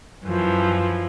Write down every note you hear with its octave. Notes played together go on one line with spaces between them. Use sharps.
F#2 E3 F3